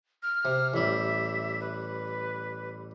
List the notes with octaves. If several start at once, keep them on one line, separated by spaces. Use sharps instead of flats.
F6
C3
A1 G3 E5
B4